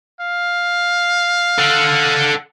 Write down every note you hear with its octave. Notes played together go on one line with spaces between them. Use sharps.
F5
A4 F#5